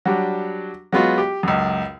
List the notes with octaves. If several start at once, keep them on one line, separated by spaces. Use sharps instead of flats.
F#3 G3 D4
F#3 G#3 B3 F4 F#4
G4
C#2 F#2